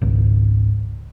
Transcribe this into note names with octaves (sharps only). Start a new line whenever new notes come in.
G#1 C#2